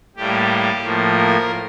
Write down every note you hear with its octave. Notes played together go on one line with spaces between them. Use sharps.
A2 G3 A#3 G4
A2 F3 A#3
A#4